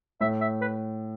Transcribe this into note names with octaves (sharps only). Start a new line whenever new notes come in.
A2 E5
E5
B4